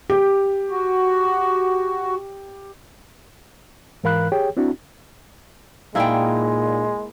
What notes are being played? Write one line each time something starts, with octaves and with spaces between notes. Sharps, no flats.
G4
F#4
G#2 E3 A#4 F5 B5 F#6
G4 G#4 C#5 G5
C4 D4 E4 F#4
A#2 G#3 A#3 D#4 E4 G#4 D5 G5